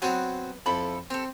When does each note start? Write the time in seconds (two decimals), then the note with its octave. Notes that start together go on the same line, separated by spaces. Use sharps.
0.02 F#3 B3 C4 F#4 F#6
0.66 F2 E4 A4 B5
1.10 C4 G4 A4